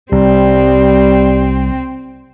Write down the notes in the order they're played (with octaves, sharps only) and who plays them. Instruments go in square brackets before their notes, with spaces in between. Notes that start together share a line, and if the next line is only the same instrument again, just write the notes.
[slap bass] C2 [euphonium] G3 [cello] C4